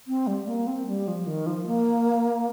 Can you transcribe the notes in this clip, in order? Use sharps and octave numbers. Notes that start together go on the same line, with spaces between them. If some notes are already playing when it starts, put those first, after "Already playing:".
C4
G3
A#3
C4
G3
F3
D#3
F3
A#3